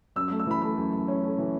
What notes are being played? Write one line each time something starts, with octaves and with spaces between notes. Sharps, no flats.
F#2 E6
E6
A3
E6
E3 B5
A3 B5
F#2
F#2
C#4
A3
E3